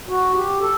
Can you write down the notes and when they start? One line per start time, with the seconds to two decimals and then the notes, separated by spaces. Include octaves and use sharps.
0.09 F#4
0.36 G4
0.61 A4